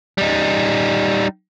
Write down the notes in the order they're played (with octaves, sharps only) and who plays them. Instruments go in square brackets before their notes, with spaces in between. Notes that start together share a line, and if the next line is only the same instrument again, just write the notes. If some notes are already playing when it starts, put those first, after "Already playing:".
[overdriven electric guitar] G3 D#4